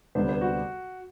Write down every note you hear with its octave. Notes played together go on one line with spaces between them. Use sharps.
D2 C3 G3 B3 D4 C5
C5
F#4